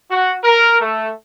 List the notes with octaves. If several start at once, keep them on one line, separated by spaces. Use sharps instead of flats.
F#4
A#4
A3